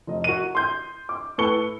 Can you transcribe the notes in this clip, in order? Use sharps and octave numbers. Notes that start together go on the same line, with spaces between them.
F1 D#5
F#4 A#4 D#7
C6 G6
D6
A2 A4 B4 C#6 C#7 G7